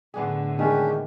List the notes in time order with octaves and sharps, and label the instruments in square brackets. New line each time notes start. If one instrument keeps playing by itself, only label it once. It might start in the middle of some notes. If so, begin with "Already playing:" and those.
[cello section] A2 D3 [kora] B3 D4 G#4
[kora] D#3 E3 [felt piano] G#3 [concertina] C#4 D4 G4